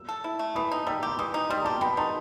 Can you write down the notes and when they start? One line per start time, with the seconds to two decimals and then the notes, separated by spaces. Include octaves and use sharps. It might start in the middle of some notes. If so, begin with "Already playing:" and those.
Already playing: E6
0.09 A4
0.24 E4
0.39 A3
0.55 E3 B5 D#6
0.72 D#4
0.87 G3 E6
1.03 G4 C6 E6
1.18 E3 B5 D#6
1.34 D#4
1.50 G3 C6
1.57 D#6
1.64 G4 A5 C6
1.81 B2 G5 B5
1.97 D#4 A5 C6